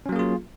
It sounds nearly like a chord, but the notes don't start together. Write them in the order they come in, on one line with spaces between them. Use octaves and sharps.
C#4 F#3 A#3 G#4 F4